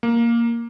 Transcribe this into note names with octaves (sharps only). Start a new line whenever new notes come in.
A#3